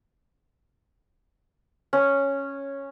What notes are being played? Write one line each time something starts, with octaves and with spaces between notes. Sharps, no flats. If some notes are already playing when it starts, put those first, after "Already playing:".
C#4